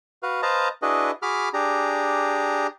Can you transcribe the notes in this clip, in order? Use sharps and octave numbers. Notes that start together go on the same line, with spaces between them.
F#4 B4 F5
B4 C5 D#5 F5 A5 A#5
D4 E4 F#4 G#4 B4 D#5
F#4 G#4 B5 D6 F6
D4 G4 G#4 A#5